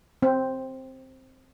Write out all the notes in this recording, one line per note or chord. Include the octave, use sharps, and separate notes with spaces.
C4